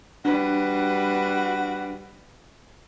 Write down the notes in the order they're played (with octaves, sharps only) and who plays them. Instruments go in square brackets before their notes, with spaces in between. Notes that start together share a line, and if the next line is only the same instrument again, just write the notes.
[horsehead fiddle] G3 B4 [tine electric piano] D4 [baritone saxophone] F#4